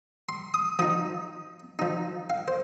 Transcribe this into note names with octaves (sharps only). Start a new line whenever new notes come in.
C6
D#6
F3 D#4 D#6
F3 D#4
F5
C5